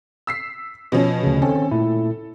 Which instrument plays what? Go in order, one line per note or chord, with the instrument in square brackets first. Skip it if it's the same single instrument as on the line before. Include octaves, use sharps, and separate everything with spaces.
[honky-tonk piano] E6 B6 C7
B2 F3 C#4
[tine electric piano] D2 C#3
[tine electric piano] D#3 C4 C#4 [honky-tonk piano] A4
[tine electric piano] A#2 A3 E4